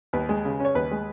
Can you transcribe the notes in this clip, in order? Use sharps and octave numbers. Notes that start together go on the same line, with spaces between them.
D#2 B4
G#3
C#3
C#4
C#5
D#2 B4
G#3